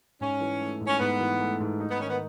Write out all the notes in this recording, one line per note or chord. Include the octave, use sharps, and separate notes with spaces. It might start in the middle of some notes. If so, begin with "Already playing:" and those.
G#2 C#4
E3
A3
G#2
C#4
G#2 B3
E3
A3
G#2
D#4
B3
D#3 C#4
B3